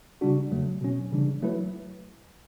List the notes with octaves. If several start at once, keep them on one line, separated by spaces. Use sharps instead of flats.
C#3 G3 D4 F#4
E2 C#3 F#3 A3
B2 F#3 C#4
C#3 E3 G3 D4
F#3 A3 E4 B4